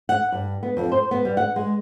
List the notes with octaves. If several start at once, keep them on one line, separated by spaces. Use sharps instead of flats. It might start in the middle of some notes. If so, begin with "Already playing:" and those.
F#5
G2
B3
F2
C5
B3
G3
F#5
G#3